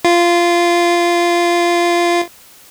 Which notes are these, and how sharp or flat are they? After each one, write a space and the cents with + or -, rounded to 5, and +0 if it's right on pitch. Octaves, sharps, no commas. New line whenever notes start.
F4 -15